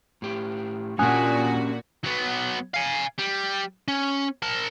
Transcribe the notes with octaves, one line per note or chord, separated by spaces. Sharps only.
A2 G4
A#2 C#4 D4 F#4 G4 G#5 D#6 F#6
F#3 B3
F5 G#5
G3
C#4
A#4 A5